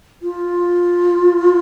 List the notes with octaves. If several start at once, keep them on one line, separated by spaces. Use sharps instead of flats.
F4